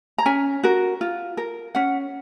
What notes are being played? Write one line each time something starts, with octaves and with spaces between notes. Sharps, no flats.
A#5
C#4 G#5
F#4 A#4
F4
A#4
C#4 F#5